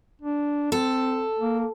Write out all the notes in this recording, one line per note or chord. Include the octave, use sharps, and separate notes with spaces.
D4
C4 A4
A#3